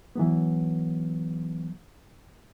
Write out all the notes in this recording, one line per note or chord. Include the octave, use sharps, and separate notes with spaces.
E3 F#3 B3